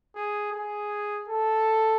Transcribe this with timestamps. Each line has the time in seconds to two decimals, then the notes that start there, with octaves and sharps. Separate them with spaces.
0.15 G#4
0.53 G#4
1.28 A4